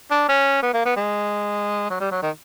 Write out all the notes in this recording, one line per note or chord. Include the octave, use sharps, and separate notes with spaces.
D4
C#4
B3
A#3
B3
G#3
F#3
G3
F#3
D#3